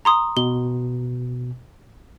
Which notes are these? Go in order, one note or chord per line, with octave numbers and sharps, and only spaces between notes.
A#5 C6 D#6
B2 G7